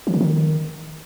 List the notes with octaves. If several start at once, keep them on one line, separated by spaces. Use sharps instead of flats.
E3
D3
D#3